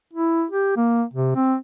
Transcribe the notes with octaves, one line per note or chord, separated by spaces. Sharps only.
E4
G4
A#3
C3
C4